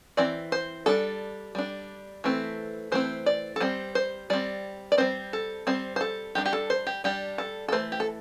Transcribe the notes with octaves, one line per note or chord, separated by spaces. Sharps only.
E3 C4 D5
C5
G3 D4 A4
G3 D4
E3 A3 C4
E3 A3 C4 C5
D5
A4
G3 C4 C5
C5
G3 C4 D5
D5
G3 C4 C5
A4
G3 C4 C5
C5
A4
G3 D4 G4
G4
A4
C5
G4
G3 D4 G4
A4
A4
E3 A3 C5
G4
A4